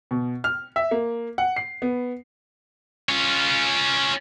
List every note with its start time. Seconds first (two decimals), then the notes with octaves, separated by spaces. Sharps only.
0.11 B2
0.44 F6
0.76 E5
0.91 A#3
1.38 F#5
1.57 C7
1.82 B3
3.09 C#4 F4